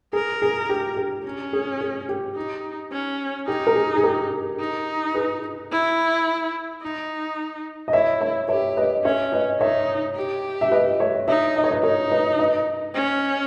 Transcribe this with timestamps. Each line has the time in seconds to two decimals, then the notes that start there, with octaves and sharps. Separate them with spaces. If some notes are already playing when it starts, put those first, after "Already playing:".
0.13 G#4 A#4
0.42 G#4
0.69 G4
0.97 G4
1.25 C#4
1.53 G#4
1.81 G#4
2.09 G4
2.36 D#4
2.92 C#4
3.48 D#4 G4
3.67 A#4
3.76 G#4
3.96 G#4
4.03 G4 A#4
4.60 D#4
5.14 G#4 B4
5.71 E4
6.82 D#4
7.88 D#5
7.93 E4 C#5 E5
8.21 C#5 E5
8.49 G4 C#5 E5
8.77 B4 D#5
9.04 C#4 C#5 E5
9.32 B4 D#5
9.61 D#4 C#5 E5
10.16 G4
10.61 E5
10.71 B4 D#5
11.00 C#5 E5
11.28 D#4 C#5 E5
11.56 D#5
11.64 C#5
11.71 B4 D#5
11.83 D#4 A#4 C#5
12.11 B4 D#5
12.39 B4 D#5
12.95 C#4